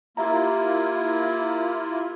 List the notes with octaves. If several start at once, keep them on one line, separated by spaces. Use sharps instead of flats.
A#3 E4 F4 G4 E5 A#5